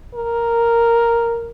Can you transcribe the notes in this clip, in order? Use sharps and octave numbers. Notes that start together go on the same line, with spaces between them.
A#4